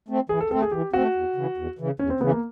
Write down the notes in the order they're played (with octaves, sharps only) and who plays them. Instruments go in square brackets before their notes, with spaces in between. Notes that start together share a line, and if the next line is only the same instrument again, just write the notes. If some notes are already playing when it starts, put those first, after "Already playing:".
[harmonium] A3 C4
[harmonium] E3 [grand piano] G#4
[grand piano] A4
[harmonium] C4 [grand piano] A4
[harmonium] A3
[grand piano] G#4
[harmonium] E3 [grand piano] G4
[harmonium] A3 C4 [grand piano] F#4
[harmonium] E2
C#3 E3
E2
C#3 E3
[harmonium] E2 [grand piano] C#4
[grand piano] C4
[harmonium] C#3 E3 [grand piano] B3
[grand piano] A#3